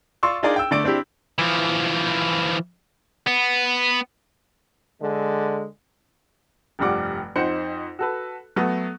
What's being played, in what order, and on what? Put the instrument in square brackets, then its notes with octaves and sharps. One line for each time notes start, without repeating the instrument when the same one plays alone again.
[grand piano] F4 D5 C6 C#6 E6
D4 D#4 F4 G#4 A#4 D5
G5 E6
D3 A3 D5 D7
C4 D4 E4 G4
[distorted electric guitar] E3 F3
B3
[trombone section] D3 G#3
[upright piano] F1 G2 F3 G3 F#5 D6
F2 D#4 C5 F#5 C#7
F#4 A4 B4
F#3 A3 B3